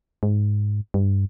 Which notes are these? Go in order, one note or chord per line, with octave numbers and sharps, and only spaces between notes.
G#2
G2